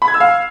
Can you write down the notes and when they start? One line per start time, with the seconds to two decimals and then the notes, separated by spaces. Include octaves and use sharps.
0.02 B5
0.08 G#6
0.14 E6
0.20 F5